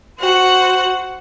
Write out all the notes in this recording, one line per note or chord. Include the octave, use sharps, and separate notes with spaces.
F#4 C5 F#5